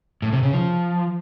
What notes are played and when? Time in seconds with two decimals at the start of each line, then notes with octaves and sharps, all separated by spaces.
0.22 A2
0.33 C3
0.43 C#3
0.53 F3